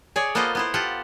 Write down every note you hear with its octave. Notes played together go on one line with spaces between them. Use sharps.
G#4 C#5 D5
A#3 B3 F4 A4 C5 D#5
B3 E4 C5
F4 G4 A4 F#5